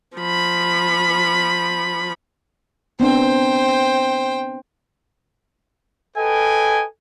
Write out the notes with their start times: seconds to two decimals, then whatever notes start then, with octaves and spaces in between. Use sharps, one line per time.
0.17 F3 B5
3.00 B3 C4 D4 C5 G5
6.17 A4 B4 D#5 G5 G#5